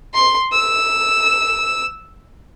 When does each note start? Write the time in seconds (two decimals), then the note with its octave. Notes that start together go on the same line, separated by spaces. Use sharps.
0.14 C6
0.52 E6